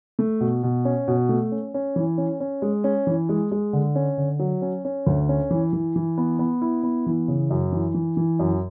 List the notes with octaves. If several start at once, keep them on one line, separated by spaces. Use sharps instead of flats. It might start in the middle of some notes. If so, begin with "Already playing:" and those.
A3
B2
B2
C#4
B2
A3
C#4
C#4
E3
C#4
C#4
G#3
C#4
E3
G#3
G#3
D3
C#4
D3
F#3
C#4
C#4
D2
C#4
E3
E3
E3
B3
B3
E4
B3
E3
C#3
F#2
E3
E3
E3
F#2